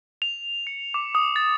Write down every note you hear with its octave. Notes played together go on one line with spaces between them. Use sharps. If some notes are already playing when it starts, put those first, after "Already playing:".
F7
C#7
D6
D#6
A6